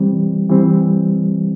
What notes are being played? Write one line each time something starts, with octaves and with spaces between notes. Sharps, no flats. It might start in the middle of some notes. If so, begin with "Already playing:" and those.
Already playing: E3 G3 C4
E3 G3 C4